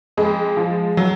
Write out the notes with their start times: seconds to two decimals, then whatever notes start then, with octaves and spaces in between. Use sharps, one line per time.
0.17 F2 G#3
0.57 F3
0.97 F#3